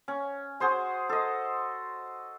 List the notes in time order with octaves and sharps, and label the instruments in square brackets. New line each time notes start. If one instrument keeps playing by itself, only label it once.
[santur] C#4
F#4 G#4 C5 C6
A4 D#5